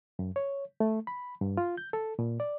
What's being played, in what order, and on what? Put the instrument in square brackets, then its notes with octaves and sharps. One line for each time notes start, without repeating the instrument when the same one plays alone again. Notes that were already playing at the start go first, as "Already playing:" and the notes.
[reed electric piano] F#2
C#5
A3
B5
G2
F4
G6
A4
A#2
D5